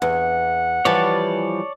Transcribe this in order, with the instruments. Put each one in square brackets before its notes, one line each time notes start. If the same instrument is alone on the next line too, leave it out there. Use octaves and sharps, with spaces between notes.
[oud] E2 [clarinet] F#5
[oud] E3 F3 G3 [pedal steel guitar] C#5 D5 A5